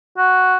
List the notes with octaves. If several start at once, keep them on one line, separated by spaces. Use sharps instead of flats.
F#4